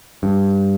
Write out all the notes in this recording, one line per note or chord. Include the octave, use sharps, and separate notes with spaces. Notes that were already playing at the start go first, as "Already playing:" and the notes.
G2